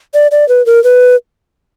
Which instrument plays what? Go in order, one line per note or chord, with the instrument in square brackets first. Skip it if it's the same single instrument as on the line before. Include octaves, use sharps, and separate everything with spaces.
[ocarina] D5
D5
B4
A#4
B4